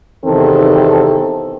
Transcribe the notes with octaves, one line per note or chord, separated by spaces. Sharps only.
E2 C3 D#3 C4 A4